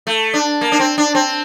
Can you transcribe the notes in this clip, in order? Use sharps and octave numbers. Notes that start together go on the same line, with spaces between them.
A3
D4
A#3
D4
C4
D4
C4